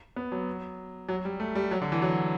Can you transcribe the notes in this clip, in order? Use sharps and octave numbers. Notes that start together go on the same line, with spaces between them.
B3
F#3
F#3
G3
A3
G3
F#3
D3
E3
F#3